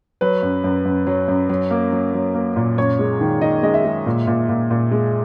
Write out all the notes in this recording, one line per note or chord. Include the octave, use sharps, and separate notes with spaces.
F#3 B4
F#2
F#2
F#2
F#3
F#2
F#3
A#3
F#3
F#3
A#3
A#2
F#2 C#5
G#3
D#3
D#3 D#5
G#3 D#5
E5
G#3
A#2
A#2
A#2
A#2
G#3